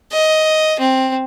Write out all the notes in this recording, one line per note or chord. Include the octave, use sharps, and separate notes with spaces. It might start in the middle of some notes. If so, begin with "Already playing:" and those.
D#5
C4